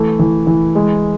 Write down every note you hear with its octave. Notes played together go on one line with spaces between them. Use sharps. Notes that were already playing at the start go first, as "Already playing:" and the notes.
Already playing: E3 A3
E3
E3
G#3